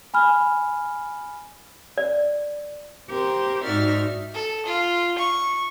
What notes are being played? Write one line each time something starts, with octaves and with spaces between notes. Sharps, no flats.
G#5 B5 F6
D5
C4 G4 A#4 C5
G#2 D#4 F#4 D5 E5 F6
A4
F4
C#6